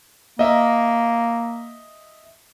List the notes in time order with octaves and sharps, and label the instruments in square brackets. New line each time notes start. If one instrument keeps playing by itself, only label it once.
[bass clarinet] A#3 [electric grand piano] D#5 E5